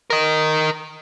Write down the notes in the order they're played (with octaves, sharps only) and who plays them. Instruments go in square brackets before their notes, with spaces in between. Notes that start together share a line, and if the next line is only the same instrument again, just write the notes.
[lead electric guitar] A#4 D#5